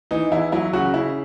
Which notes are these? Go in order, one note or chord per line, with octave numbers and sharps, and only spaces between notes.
E3 D#4
E2 E4
F#3 E4
C#3 F#4
C#3 E4